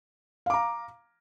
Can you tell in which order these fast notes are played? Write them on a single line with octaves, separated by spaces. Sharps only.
F5 D6 A#5